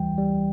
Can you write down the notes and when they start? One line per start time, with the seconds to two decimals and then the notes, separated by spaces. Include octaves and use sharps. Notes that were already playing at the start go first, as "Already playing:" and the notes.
Already playing: D2 E3 G3 G5
0.18 G3